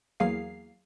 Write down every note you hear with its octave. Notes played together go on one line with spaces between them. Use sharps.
E2 F#3 A#3 G#4 F5 C7